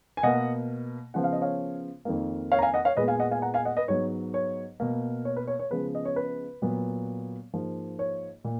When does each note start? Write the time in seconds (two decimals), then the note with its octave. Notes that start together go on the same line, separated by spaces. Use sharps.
0.17 G#5
0.23 B2 A#3 D#5 F#5
1.14 C#3 F3 B3 F#5
1.24 F5
1.33 D#5
1.41 C#5 F5
2.05 F2 D#3 A#3
2.52 C#5 F5
2.59 A#5
2.62 F5 G#5
2.74 D#5 F#5
2.85 C#5 F5
2.97 A#2 G#3 B3 B4 D#5
3.08 F5 G#5
3.20 D#5 F#5
3.31 F5 G#5
3.42 F#5 A#5
3.54 F5 G#5
3.65 D#5 F#5
3.77 B4 D#5
3.88 G#2 F#3 B3 C#5
4.34 C#5
4.80 B2 A#3
5.25 C#5
5.36 B4
5.47 C#5
5.59 C#5
5.70 C#3 F3 G#3 B3 B4
5.95 D#5
6.05 C#5
6.16 B4
6.62 A#2 F#3 B3
7.53 G#2 F3 A#3
7.99 C#5
8.45 A#2